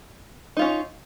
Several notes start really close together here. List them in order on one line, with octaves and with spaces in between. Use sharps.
D#4 F4 C#4